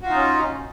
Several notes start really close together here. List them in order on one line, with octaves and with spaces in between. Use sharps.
F#4 F4 D#4 C#4